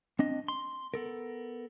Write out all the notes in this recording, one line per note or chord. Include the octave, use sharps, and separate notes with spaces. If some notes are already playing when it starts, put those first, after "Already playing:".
C4 D4 D#5
C6
B3 A4 A#4